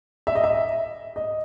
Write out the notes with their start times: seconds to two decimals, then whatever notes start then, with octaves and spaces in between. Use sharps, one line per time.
0.27 E5
0.35 D#5
0.44 E5
1.16 D#5